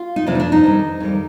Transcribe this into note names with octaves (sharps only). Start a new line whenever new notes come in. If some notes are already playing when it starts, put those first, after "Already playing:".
Already playing: F4
D#4
F2 C3 F3 D4
D#4
D4
D#4
F2 D#3 G3
F2 D#3 G3